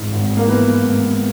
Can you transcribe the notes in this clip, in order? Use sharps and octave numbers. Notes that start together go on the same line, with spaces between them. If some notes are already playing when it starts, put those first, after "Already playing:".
Already playing: G#1 G#2 E3
G#1
A#3
E3 B3
G#1